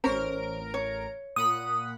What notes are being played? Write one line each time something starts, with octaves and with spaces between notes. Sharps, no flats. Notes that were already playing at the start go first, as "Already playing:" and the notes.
A1 C#4 A#4 C5 A#5 D7
C#5
A#2 F#5 B5 D#6